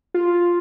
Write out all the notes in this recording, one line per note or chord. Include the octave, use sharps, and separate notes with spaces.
F4